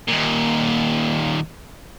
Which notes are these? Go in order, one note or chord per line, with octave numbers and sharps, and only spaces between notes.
D#2 A#2